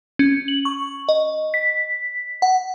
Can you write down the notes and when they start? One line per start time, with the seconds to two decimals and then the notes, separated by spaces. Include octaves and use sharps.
0.19 C#4
0.48 F#7
0.65 C#6
1.09 D#5
1.54 B6
2.42 F#5